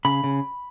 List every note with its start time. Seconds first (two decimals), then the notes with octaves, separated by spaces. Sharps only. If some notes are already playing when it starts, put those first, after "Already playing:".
0.05 C#3 B5
0.24 C#3